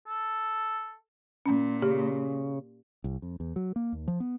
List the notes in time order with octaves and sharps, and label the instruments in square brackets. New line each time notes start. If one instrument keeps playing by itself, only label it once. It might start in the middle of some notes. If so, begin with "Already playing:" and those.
[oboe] A4
[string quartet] A#2 [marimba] C#4
[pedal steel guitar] C#3 [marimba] G4
[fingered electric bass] C2
F2
E2
F#3
A#3
D#2
F3
B3